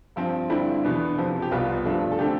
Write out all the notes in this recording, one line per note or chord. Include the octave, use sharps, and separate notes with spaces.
G2 F3 C4
G2 D3 G3 C4 E4
E2 B2 B3 D4
F2 C3 F3
G4
C2 B2 G3 B3 F4
G2 F3 A3 D4
A4
D3 A3 C4 G4